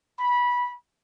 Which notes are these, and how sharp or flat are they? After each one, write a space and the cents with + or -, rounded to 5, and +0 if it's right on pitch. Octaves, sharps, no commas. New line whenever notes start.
B5 -15